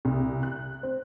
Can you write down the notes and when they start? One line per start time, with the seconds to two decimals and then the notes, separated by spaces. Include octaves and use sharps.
0.05 C2
0.43 F#6
0.83 C4